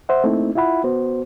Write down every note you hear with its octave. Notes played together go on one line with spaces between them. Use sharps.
C5 E5 F#5
A3 A#3 C4 D#4 E4
E4 F4 E5 F#5 B5
B3 F#4 C5